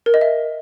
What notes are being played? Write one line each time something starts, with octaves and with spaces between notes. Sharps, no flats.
A#4
D#5
E5